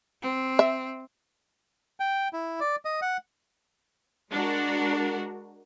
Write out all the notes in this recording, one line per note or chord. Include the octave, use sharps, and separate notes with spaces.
C4
E5
G5
E4
D5
D#5
F#5
G#3 D4 F#4 A#4